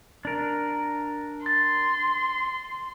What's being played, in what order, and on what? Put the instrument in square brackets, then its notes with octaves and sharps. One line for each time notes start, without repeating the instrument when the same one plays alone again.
[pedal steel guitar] D4 A#4
[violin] C6 [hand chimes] A6